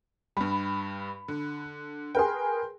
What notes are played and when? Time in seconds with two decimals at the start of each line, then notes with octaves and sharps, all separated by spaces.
0.37 G2 G3 B5
1.28 D3
2.15 G#4 A#4 B4 G5 C6